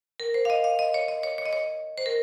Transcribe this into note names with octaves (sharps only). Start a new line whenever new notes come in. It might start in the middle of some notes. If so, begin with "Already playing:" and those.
A#4
C5
F5
D#5
F5
D#5
C#5
D#5
C#5
C#5
D#5
C#5
C5
A#4